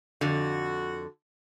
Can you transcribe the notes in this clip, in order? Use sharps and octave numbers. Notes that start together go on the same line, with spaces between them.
F2 D3 F#4